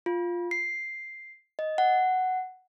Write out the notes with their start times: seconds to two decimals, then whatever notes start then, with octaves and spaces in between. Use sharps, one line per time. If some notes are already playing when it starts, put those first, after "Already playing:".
0.06 F4
0.51 C7
1.59 D#5
1.78 F#5